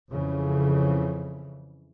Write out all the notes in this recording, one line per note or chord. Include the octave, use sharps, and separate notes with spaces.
F2 C#3 E3